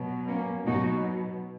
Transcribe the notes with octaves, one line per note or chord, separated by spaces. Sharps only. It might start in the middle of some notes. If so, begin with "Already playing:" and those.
Already playing: B2 F#3
A#3 C#4
B2 F#3 D#4 F#4